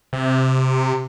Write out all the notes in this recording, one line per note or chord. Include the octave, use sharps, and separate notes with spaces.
C3